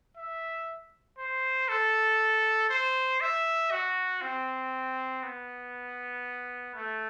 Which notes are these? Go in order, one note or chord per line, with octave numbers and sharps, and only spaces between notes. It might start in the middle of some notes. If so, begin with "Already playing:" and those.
E5
C5
A4
C5
E5
F#4
C4
B3
A3